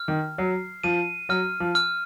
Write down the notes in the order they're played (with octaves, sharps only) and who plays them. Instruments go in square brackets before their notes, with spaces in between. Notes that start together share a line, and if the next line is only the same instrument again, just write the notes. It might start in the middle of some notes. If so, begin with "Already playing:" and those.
Already playing: [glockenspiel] F6
[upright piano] D#3
[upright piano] F#3 [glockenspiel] C7
[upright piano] F3 [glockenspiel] D#7
[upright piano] F#3 [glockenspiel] F6
[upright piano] F3
[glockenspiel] F6